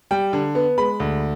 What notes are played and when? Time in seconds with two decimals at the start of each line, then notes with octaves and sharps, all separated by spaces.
0.11 G3 G5
0.33 D3
0.55 B3
0.78 G#3 B5
1.00 D2